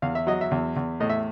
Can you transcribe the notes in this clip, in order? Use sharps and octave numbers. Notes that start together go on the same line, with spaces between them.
E2 F5
E5
F#3 D#5
E5
E2
E2
A2 D#5
E5